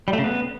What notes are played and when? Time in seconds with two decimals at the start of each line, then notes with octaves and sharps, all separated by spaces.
0.08 G3
0.13 A3
0.19 C#3
0.24 B3